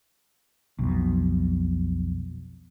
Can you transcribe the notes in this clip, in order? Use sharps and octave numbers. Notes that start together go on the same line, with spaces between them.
B1 F2 B2